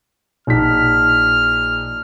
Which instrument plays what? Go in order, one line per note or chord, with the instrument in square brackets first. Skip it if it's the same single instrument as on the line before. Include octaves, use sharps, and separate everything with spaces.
[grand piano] A#1 D#4 B6 [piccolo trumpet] F6